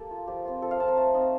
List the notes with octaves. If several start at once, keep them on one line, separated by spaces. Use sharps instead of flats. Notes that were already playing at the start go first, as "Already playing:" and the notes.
Already playing: A#3 G4 A4
F4
F3 G4
C4 F4
F3 A4
F5
C4 F4 A5
A#5
A3 A5
C4 D#4